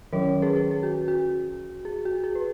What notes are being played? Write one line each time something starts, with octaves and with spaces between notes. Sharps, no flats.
D#3 F#3 C#4 A#4 C#5
G#4 B4
G#4
G#4
F#4
F#4
G#4
F#4
G#4
B4